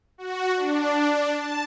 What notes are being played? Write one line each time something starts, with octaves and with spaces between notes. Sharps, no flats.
F#4
D4
A5